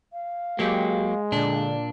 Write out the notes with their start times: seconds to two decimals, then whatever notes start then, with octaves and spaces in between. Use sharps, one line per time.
0.12 F5
0.59 F#3 G#3 A#3 G4
1.32 A#2 D3 D4